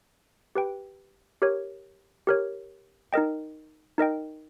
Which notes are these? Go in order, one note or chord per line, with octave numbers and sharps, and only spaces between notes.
G4 B4 G5
G4 A#4 C#5
G4 A#4 C#5
D#4 A#4 D#5 G5
D#4 A#4 D#5 G5